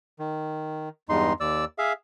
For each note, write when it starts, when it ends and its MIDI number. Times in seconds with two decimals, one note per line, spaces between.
0.19 0.89 51
1.09 1.33 40
1.09 1.33 43
1.09 1.33 56
1.09 1.33 63
1.09 1.33 84
1.40 1.65 39
1.40 1.65 74
1.40 1.65 88
1.78 1.93 68
1.78 1.93 76
1.78 1.93 77